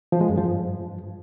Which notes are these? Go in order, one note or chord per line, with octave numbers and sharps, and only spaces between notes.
F3
G#3
F#2
F3
G2